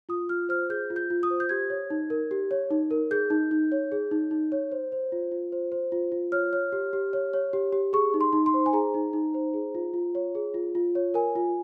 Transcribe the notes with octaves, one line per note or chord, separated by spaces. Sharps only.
F4 D#6
F4 F6
C5 F6
G#4 G6
F4
G6
F4
D#6
C5
G6
G4 G#6
C#5
D#4
A#4
G4
C#5
D#4
A#4
G#4 G6
D#4
D#4
C#5
G#4
D#4
D#4
C#5
C5
C5
F4
F4
C5
C5
F4
F4
C#5 F6
C#5
G4
G4
C#5
C#5
G4
G4
G#4 C#6
D#4
C6
D#4
C6
C5
G#5
G#4 A#5
D#4
D#4
C5
G#4
F4
F4
C#5
G#4
F4
F4
C#5
A#4 G#5
F4